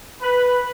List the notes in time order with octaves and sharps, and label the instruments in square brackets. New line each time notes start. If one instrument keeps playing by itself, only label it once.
[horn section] B4